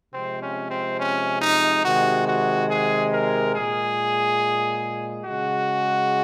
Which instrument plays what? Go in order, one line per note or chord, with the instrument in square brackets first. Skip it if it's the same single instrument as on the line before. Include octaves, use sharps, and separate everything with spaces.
[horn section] C3 F3 G#3 C4
C#4
C4
C#4
D#4
C3 D#3 G#3 F#4
F#4
G#4
A#4
A#2 G#3 G#4
C#3 G#3 F#4